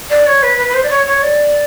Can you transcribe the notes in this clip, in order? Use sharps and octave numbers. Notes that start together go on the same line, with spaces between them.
D5
C#5
B4
B4
B4
C5
D5
C#5
C#5
D5